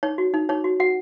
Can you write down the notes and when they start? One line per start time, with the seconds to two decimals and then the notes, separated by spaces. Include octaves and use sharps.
0.03 D#4 C#5
0.18 F#4
0.34 D#4
0.49 D#4 C#5
0.64 F#4
0.80 F#4 F#5